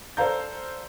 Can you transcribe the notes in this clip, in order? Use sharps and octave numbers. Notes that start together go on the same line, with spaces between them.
A4 C5 D5 F5 A#5 G6